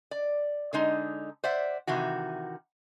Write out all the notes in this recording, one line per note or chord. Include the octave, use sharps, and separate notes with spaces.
D5
D3 G#3 D#4
C5 D5 E5 F#5
C3 D#3 E3 F#4